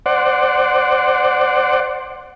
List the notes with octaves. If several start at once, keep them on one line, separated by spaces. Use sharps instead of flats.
C5 D5 F#5